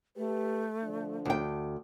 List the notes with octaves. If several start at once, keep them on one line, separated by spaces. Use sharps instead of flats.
A3 G4 B4
D3 F3 D4
D2 G5